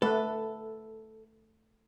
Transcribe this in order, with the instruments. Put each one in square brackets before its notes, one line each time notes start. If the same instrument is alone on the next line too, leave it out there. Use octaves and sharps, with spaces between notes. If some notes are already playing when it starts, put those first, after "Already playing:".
[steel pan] A3 B4 [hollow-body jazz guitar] A4